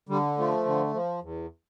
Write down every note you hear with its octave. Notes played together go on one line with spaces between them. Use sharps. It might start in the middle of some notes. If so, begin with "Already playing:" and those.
D3 G3
F3 A3
D3
F3
E2